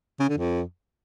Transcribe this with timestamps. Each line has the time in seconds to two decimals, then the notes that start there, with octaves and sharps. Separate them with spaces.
0.20 C#3
0.29 D3
0.38 F2